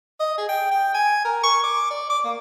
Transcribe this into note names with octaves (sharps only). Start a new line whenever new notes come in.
D#5
G#4
G5
G5
G#5
A#4
C#6
D6
D5
D6
A#3